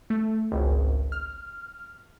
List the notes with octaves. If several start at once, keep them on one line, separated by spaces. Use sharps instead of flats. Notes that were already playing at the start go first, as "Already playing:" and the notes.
A3
G#1 C#2
F6